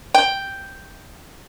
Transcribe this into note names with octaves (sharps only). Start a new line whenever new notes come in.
G5